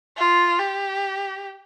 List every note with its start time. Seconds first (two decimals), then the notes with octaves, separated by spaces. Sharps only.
0.17 F4
0.59 G4